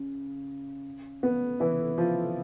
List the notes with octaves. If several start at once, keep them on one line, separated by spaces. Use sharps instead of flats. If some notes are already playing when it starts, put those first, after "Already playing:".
Already playing: C#3
B3
E3 E4
F3 F4